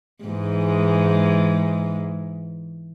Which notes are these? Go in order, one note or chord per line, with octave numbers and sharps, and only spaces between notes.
G#2 E3 G#3